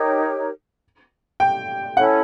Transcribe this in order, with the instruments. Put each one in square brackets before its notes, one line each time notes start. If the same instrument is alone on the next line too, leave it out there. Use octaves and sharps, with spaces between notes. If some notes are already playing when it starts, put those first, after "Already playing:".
Already playing: [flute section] D#4 G4 A#4 C#5
[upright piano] G5
[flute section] C#4 E4 A4 C#5 [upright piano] F#5